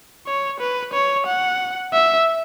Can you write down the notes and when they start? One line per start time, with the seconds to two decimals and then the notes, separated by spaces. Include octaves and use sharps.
0.27 C#5
0.60 B4
0.94 C#5
1.27 F#5
1.93 E5